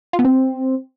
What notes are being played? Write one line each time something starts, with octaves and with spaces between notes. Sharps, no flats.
F4
B3
C4